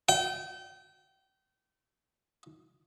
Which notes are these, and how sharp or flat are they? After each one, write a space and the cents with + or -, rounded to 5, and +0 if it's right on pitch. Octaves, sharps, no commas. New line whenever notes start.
G5 -30